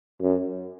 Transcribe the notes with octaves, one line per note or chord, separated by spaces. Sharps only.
F#2